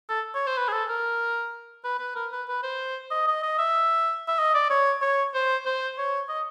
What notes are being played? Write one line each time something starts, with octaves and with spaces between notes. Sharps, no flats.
A4
C#5
C5
B4
G#4
A4
A#4
B4
B4
A#4
B4
B4
C5
D#5
D#5
D#5
E5
E5
D#5
D5
C#5
C#5
C5
C5
C#5
D#5